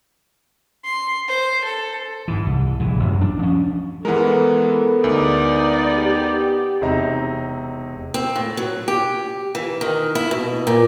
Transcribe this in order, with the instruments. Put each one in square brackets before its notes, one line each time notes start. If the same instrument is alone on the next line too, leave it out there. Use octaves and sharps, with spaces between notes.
[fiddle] C6
C5
A4
[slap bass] G#2 E3
C2
A#1 E3
A1 F#2 F#3
D4
F3 C#4
[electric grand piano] E3 G#3 [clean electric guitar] B3 A#4 [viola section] A4
[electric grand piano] D2 [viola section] G#3 [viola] D#4 D5
[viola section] G4
[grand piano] E1 C3 C4 D#4 A#5
[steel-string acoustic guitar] C4
A2
F#3
G4
E3
D#3
E4
B2
A#2